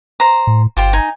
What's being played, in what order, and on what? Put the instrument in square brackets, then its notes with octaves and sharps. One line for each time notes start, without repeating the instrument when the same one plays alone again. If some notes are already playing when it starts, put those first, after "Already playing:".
[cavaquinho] C5 A#5
[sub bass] A2
[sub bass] G1 [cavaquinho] F4 G4 C5
[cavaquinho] D#4 G#5